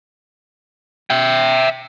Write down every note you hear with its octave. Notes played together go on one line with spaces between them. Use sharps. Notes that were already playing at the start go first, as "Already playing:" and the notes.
E5 G5